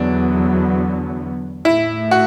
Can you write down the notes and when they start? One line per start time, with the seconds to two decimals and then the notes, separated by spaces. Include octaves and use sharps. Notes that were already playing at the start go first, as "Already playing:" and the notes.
Already playing: E2 D3 F#3 B3 D4
1.65 A2 A3 E4
2.11 F#4